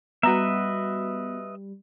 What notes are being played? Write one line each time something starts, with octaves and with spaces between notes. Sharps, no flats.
G3 B3 F#4 B4 D#5 E5 A#5